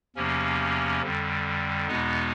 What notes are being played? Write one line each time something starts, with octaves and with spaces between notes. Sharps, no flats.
E2 C3 F3 A#3 C#4
F2 D3 G3
E2 B2 G#3 B3 D#4